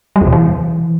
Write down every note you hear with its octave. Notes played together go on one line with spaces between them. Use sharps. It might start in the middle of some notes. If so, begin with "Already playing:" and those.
G3
E2
B2
E3